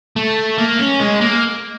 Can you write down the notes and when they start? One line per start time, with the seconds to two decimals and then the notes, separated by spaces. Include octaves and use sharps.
0.16 A3
0.58 A#3
0.79 C#4
1.00 G#3
1.21 A#3